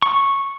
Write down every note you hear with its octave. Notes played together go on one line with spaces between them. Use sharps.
C#6